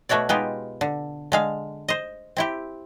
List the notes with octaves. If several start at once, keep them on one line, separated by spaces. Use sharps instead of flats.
B2 A3 F#4 C#5 D5
G#3 B3 D#4 F4 G4
D3
D3 G#3 F5
C5 D#5
C4 E4 G4